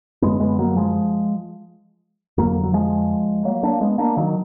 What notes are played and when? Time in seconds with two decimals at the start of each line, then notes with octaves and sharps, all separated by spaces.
0.22 F#2 D3 G#3 B3
0.40 G#3 B3
0.59 F#3 A#3
0.76 F3 G#3
2.38 F2 D3 F#3 A#3
2.63 F#3
2.73 F3 G#3
3.45 F#3 A#3
3.63 A#3 D4
3.81 G#3 B3
3.98 A#3 D4
4.17 D#3 F#3